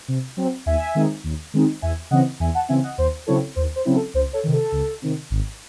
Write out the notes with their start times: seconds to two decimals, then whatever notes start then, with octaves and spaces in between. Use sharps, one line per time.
0.08 C3
0.37 F#3 C4
0.66 D#2 E5 G#5
0.95 D#3 G#3 C4 D#4
1.24 D#2
1.54 D#3 G#3 C4 D#4
1.82 E2 E5 G#5
2.11 C#3 E3 C4 D#5 F#5
2.40 E2 E5 G#5
2.55 F#5 A5
2.69 C#3 E3 C4 E5 G#5
2.84 D#5 F#5
2.98 D#2 C5
3.27 C#3 F#3 C4 E4 A4 C#5
3.56 D#2 C5
3.76 C5
3.85 C#3 F#3 C4 E4
3.95 A4
4.14 C#2 C5
4.33 A4 C#5
4.44 C3 D#3
4.53 A4
4.72 C#2
5.02 C3 D#3
5.30 G#1